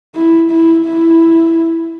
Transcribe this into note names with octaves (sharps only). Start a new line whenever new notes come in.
E4
E4
E4